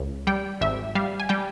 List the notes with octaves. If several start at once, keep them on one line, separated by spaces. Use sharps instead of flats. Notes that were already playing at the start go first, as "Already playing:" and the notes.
Already playing: C#2
G3 G5
G#1 E5
G3 F5
G#5
G3 G5